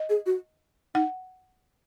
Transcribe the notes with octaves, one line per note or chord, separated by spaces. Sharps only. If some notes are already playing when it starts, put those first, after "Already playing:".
Already playing: D#5
G#4
F#4
D#4 F#5